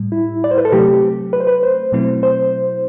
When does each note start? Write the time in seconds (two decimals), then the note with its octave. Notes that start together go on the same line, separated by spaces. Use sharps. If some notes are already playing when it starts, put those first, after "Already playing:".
Already playing: A2 G3
0.12 E4
0.44 D5
0.51 C5
0.58 B4
0.65 A4
0.72 C3 F#3 A3 G4
1.33 B4
1.40 C5
1.47 B4
1.63 C5
1.92 B2 F#3 A3 C4 E4
2.23 C5